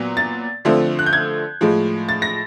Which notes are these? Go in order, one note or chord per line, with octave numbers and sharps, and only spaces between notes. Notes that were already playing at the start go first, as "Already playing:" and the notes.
Already playing: A#2 F#3 B3
A6
D3 F3 A3 C4
F#6
G6
G#6
A2 F3 G#3
A6
A#6